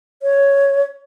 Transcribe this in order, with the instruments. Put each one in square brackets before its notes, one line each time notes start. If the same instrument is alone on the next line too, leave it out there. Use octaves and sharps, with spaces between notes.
[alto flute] C#5